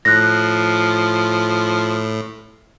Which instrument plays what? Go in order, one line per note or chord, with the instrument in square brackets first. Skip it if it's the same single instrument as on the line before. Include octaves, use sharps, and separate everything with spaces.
[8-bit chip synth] A2 [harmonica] F3 [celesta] F#6 A#6